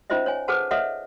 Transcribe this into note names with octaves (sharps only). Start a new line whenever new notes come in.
C#4 D#4 F4 C5 D#5 E5
C#5 G#5
G#4 A4 B4 C5 F#5 A5
A4 B4 C#5 D#5 E5 F#5